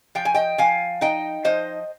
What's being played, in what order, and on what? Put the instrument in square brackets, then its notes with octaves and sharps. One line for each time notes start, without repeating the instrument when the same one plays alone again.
[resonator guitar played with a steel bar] F3 G5
G#5
D#5 G5
F3 F5 G#5
D#4 D#5 G5
F3 C5 D#5